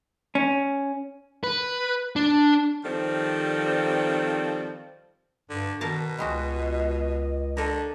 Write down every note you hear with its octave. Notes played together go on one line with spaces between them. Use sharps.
C#4
B4
D4
D#3 F3 G3 C4 A4
G2 D3
B2 D#3 A#4 A5
C#2 G3 G#3 F#4 D#5
D3 A4 A#4